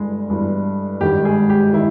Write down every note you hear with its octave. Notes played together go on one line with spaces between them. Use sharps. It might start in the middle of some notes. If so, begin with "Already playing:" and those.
Already playing: G1 G2 E3 G#3
G1 G2 E3
G#1 G2 D#3 G4
G#4
G4
D#3 E4